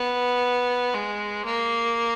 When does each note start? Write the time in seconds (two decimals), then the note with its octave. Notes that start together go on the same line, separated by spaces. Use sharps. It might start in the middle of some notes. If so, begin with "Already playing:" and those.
Already playing: B3
0.95 G#3
1.46 A#3